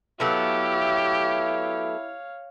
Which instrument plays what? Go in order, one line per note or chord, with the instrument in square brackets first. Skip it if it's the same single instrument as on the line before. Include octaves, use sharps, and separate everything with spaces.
[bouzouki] F#3 A3 B3 [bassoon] E4 [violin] G4 [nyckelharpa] C#5 F5